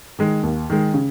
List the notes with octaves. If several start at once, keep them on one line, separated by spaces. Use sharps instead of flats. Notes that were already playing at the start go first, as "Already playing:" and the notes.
D#3 G#3
D#2
D#3 G#3
C#3